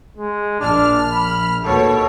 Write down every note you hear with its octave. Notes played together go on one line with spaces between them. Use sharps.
G#3
A#1 D4 F6
B5
D#2 B2 A4 C#5